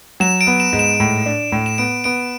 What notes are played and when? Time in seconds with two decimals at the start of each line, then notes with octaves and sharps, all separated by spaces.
0.20 F#3 E7
0.41 D7
0.47 B3
0.60 E7
0.73 G#2
0.79 E7
1.00 A2
1.26 D4
1.52 A2
1.66 E7
1.78 B3 D7
2.04 B3 D7